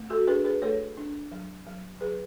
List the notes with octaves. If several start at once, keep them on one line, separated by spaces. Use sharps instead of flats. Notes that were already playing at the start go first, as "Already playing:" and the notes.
Already playing: A3
F#4 A4
D4 G#4 B4
G#4 B4
A3 A4 C#5
D4
F#3
F#3
F#3 G#4 B4